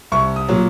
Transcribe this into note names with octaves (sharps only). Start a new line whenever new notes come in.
C2 C#6
D#6
A#2 F#3